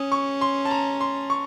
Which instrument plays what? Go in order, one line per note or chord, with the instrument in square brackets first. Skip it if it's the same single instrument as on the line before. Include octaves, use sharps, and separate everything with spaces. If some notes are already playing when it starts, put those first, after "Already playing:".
Already playing: [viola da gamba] C#4 [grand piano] D#6
[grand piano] C#6
C6
A5
A#5
C6
C#6